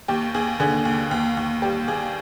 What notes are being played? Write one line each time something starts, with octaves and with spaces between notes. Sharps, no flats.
D#2 G4
D#2 G#4
D3 G#4
D#2
D#2
D#2
G3 G4
D#2 G#4